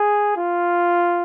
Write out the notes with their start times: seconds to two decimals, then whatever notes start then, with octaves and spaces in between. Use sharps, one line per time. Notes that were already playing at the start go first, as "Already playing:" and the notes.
Already playing: G#4
0.37 F4